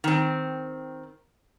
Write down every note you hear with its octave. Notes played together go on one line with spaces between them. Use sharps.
D#3 C4